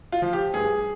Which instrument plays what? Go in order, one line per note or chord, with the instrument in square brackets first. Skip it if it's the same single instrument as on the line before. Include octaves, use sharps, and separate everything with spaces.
[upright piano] F4
F3
G4
G2 G#4